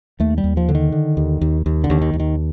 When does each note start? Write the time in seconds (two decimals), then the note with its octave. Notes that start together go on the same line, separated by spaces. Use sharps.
0.20 D#2 A3
0.38 G3
0.44 D#2
0.57 F3
0.69 D3
0.75 D#3
0.92 D3
1.17 D#2
1.41 D#2
1.66 D#2
1.84 D3
1.90 D#2
2.01 D#3
2.13 D#2
2.20 D#3